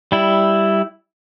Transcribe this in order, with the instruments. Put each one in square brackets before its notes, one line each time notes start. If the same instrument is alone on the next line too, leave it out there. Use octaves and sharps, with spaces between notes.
[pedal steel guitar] G3 E4